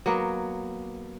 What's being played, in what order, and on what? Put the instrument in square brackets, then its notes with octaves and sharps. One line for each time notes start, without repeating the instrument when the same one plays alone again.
[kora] F#3 A#3 B3